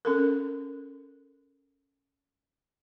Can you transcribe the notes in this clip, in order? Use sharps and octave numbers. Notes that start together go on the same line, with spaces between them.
C#4 A4 A#4